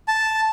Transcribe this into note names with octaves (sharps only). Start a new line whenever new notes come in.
A5